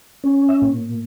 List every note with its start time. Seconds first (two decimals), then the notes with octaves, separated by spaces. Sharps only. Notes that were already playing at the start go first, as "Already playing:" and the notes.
0.24 C#4
0.49 E5
0.62 A#2